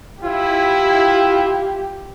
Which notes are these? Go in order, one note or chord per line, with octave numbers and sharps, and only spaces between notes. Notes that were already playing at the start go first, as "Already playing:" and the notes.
E4 F4 G4